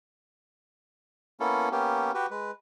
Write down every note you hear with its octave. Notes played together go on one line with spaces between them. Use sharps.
A#3 B3 C#4 E4 A4
A#3 B3 C#4 G4
F#4 G4 B4
G#3 B4